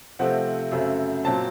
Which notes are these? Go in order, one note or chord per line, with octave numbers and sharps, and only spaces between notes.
C3 F3 A3 C4 F#5
F#2 C#3 A3 C4
A#2 F#3 C4 A5